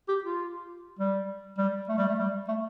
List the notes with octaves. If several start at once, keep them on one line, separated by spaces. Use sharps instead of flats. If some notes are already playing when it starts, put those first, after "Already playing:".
G4
F4
G3
G3
A3
G3
A3
G3
A3